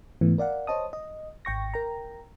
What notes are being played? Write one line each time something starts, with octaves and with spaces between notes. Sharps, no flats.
G#2 E3 A3 B3
A#4 D5 F5 F#5
C5 C#5 D#5 A5 D#6
D#5
G#1 G5 C#6 A#6
A#4 G5 A#5